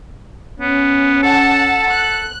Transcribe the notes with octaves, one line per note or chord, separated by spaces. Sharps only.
B3 C#4
A4 F#5 A5
F#6